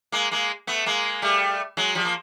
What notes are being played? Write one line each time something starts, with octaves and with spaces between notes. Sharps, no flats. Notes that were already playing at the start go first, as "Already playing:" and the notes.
G#3 A#3
G#3 A#3
A3 B3
G#3 A#3
G3 A3
F#3 G#3
F3 G3
A#3